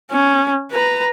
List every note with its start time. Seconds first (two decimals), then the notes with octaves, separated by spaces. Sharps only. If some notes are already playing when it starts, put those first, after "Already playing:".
0.11 C#4
0.72 B4 A#5